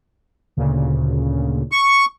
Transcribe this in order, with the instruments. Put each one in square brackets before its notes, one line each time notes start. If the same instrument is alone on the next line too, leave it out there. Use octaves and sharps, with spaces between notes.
[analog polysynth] D2 A#2 C#3
[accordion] C#6